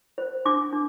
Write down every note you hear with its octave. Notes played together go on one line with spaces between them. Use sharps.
C5
D4 D6
D4